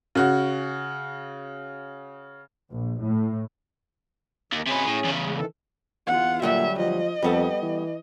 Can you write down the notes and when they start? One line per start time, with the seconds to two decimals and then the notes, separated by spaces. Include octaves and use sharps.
0.15 C#3 F#4
2.72 A#1
3.03 A2
4.52 D#2 D#3
4.66 C3 C#4 G#4 B4
4.86 A2
5.04 E2 C#3
5.24 G#3
5.36 D#3 E3 A4
6.07 E2 F4 F#5
6.42 D2 A#2 F#3 G3 E5
6.79 F3 D#5
7.23 F2 G3 B3 A4
7.62 E3